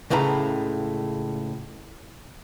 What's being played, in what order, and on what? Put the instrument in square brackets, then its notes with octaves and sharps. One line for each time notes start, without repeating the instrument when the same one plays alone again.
[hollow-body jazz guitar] C#2 A2 C#3 B4 A#5